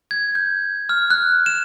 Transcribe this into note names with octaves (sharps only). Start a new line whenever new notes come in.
G#6
G6
F6
F#6
E7